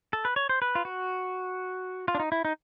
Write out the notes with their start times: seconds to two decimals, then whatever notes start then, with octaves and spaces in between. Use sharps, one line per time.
0.13 A4
0.25 B4
0.36 C#5
0.49 C5
0.62 B4
0.75 F4
0.85 F#4
2.08 F4
2.15 D4
2.20 D#4
2.32 E4
2.45 D#4